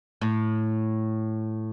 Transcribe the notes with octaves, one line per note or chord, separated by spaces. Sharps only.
A2